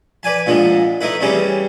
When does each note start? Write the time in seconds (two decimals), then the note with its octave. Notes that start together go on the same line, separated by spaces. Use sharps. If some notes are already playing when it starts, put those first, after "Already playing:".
0.23 B4 D5 G#5 A5
0.46 A#2 D3 F3 G#3
1.01 A3 D#4 E4 B4
1.21 C#3 E3 G3 C4 C#4